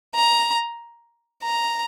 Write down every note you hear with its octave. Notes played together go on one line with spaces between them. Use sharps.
A#5
A#5